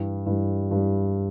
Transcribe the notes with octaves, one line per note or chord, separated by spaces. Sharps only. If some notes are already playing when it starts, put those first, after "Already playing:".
Already playing: G2 E3 G3
G2 E3 G3
G2 E3 G3